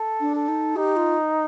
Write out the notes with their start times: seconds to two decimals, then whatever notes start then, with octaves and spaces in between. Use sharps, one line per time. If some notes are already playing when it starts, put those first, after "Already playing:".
Already playing: A4
0.20 D4
0.35 A4
0.48 D#4
0.76 D#4 G4
0.97 F4